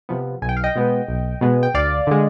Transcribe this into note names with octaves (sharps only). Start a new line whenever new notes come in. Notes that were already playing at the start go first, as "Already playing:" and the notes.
C3 F3 B3
B1 G#5
G5
F5
D#5 G5
B2 G#3 B3
B1
B2 G#3 B3
G5
D2 D5 F5
D3 G#3